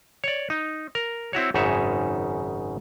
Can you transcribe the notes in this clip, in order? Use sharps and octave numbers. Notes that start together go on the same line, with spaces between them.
C#5 D5
D#4
A#4
C4 E4 F#4 C#5
G#1 F#2 C#3 D#4 C#5 E5